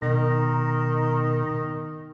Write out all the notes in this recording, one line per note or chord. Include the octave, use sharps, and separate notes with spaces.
B2 D#3 A#5